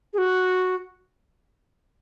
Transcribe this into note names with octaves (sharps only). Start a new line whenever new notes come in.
G#4
F#4